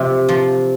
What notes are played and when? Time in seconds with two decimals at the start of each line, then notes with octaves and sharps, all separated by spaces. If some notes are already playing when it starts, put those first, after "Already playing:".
Already playing: C3 F3
0.29 F3